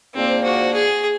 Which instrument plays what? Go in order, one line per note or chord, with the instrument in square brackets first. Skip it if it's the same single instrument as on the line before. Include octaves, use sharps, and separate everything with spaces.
[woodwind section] G#2 F3 A#3 D4 [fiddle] C4
[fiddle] F#4
G#4